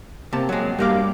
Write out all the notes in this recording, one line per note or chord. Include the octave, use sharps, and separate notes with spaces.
C3 A#3 G5 A5
F#3 G#3
G2 G3 A#3 G4 F5 D6